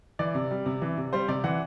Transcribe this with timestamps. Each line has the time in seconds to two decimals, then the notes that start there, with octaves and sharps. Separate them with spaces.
0.19 E3 D5
0.35 C3
0.51 G3
0.66 C3
0.82 E3
0.97 C3
1.13 G3 C5
1.28 C3 D5
1.44 E3 F#5